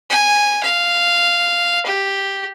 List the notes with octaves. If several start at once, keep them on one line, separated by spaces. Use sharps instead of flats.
G#5
F5
G4